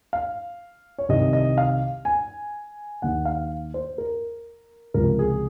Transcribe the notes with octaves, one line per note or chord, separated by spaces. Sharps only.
F5
C#5
C2 C3 D#3 D#5
D#5
F5
G#5
D#2 D#3 F#5
F5
C5
A#4
C#2 C3 F3 A#4
G#4